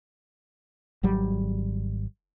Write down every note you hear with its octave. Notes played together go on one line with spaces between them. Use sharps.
G#1 F#3 G3